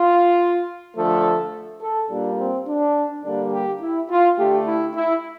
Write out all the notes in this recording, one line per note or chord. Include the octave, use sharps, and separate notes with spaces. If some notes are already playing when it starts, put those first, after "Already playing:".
Already playing: F4
D3 F3 A3 A4
A4
A#2 G3 A#3 D4
C4
D4
D3 G3 A#3 D4
G4
E4
F4
D3 A3 G4
E4
E4